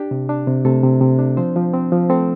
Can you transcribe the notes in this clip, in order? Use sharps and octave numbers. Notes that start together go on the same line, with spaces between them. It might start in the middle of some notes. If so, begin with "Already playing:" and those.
Already playing: D4 G4
C3
D4
C3
C3 A3 A4
C3
C3
D4
F3 C4 C5
F3
C4
F3
A3 C4 A4